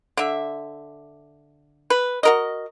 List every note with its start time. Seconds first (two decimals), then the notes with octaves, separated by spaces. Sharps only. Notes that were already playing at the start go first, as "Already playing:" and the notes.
0.17 D3 E5
1.90 B4
2.23 F#4 A#4 D#5